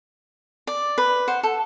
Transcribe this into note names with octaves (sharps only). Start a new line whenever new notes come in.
D5
B4
C5 F#5
A4